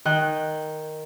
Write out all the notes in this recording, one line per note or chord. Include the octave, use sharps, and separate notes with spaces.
D#3 G5 F#6